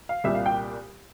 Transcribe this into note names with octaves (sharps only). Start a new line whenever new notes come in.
F5
C2 A#2 G3 E5
F5
G5